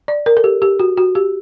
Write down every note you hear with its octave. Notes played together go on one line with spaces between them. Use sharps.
D5
A#4
A4
G4
G4
F#4
F#4
G4